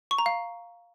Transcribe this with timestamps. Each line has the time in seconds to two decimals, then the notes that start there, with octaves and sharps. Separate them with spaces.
0.11 C#6
0.18 A#5
0.26 F5